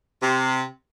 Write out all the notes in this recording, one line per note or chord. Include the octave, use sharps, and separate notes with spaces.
C3